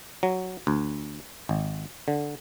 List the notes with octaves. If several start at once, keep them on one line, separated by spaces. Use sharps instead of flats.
F#3
D2
G#1
D3